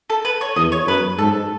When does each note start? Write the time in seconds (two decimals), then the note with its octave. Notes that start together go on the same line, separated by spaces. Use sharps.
0.10 A4
0.25 B4
0.41 C#5
0.56 E2 D#5
0.72 C#5
0.87 F#2 B4
1.19 G#2 A4